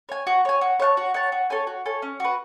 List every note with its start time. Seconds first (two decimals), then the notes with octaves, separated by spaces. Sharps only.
0.09 C#5 G#5
0.27 F#4
0.45 C#5 G#5
0.61 F#4
0.80 C#5 F#5 A5
0.97 F#4
1.14 C#5 F#5 A5
1.32 F#4
1.50 A4 C#5 G#5
1.67 F#4
1.86 A4 C#5 G#5
2.02 C#4
2.20 F#4 B4